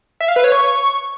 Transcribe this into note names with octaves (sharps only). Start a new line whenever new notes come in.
E5
F5
B4
C#5
C#6